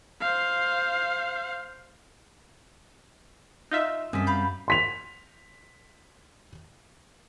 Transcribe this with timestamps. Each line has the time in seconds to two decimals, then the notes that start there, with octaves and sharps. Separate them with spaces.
0.21 C5 F5
3.71 D#4 F4 E5
4.13 F#2 G3 C4 G#4 A4 B6
4.27 F5 B5 G6
4.68 C6 B6 F7